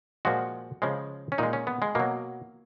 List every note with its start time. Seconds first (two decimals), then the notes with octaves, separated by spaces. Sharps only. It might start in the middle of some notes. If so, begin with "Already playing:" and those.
0.25 A#2 F3 G#3 F#4
0.82 C#3 F3 G#3
1.32 C#4
1.38 A#2 G#3 D#4
1.53 C#4
1.67 B3
1.82 G#3
1.95 B2 F#3 A#3